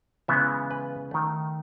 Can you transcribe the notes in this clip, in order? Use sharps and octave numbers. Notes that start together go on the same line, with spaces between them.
C#3 E3 G#3 B3 E5
B4
D#3 A3